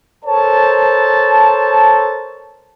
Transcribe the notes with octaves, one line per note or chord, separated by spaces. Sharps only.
A4 A#4 C5 C#5 A5